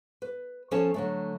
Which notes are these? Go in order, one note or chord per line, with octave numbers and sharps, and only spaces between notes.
B4
F3 C#4 A4 C#5 G#5 A5
D3 F#3 A3